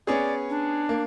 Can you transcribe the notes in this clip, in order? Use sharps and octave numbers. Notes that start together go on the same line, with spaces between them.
B3 C#4 G#4 D5
D4
A#3